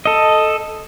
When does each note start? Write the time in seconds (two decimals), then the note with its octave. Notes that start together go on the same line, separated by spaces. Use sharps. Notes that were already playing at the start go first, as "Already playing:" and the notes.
0.06 A4 D#5